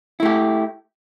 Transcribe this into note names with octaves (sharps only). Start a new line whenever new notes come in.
A3 E4 G4